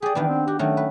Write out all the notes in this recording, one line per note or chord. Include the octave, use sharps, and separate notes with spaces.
G4 G#4 D5
D#3 E3 B3 D4
C4
F#4 G4
D#3 F#3 A3 C#4
B4